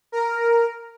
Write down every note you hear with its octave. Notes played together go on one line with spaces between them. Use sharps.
A#4